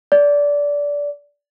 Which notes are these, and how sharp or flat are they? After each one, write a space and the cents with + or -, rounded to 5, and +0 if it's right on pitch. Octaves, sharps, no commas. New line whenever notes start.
D5 -20